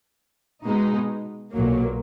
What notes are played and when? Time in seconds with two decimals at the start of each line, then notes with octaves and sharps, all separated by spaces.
0.65 B2 G#3 B3 D#4
1.53 B1 A#2 F#3 A#3